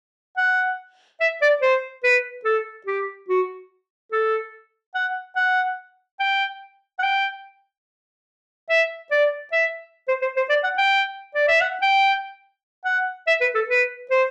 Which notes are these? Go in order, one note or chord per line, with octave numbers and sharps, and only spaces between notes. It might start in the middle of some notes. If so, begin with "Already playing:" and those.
F#5
E5
D5
C5
B4
A4
G4
F#4
A4
F#5
F#5
G5
F#5
G5
E5
D5
E5
C5
C5
C5
D5
F#5
G5
D5
E5
F#5
G5
F#5
E5
B4
A4
B4
C5